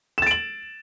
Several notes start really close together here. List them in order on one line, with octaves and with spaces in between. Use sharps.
E7 A6 D7 F#7